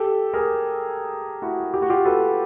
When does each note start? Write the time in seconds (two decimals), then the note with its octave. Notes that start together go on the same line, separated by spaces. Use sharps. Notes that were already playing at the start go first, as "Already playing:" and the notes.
Already playing: G4 A4
0.34 G#4 A#4
1.42 E4 F#4
1.74 G4
1.82 F#4
1.89 F4 G4
2.05 A4 B4